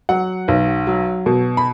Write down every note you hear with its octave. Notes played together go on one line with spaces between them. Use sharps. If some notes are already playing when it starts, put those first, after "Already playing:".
F#3 F#5
B1
F#3
B2
B5